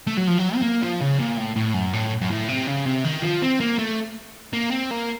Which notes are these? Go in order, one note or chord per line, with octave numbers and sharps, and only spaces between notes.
A3
F#3
F3
F#3
C4
A#3
F3
C#3
A#2
A2
A2
F#2
A2
F#2
A2
C3
C#3
C3
D#3
F3
C4
A#3
A3
A#3
C4
A#3